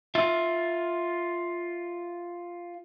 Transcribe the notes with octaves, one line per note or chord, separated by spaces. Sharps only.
F4 E5